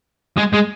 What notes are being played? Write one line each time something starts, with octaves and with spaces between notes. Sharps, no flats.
G#3
G#3